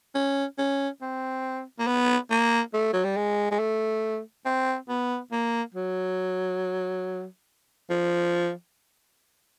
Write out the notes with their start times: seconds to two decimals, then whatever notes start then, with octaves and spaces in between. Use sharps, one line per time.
0.15 C#4
0.59 C#4
1.02 C4
1.79 A#3
1.87 B3
2.31 A#3
2.74 A3
2.93 F#3
3.05 G3
3.17 G#3
3.51 G#3
3.60 A3
4.46 C4
4.89 B3
5.32 A#3
5.75 F#3
7.90 F3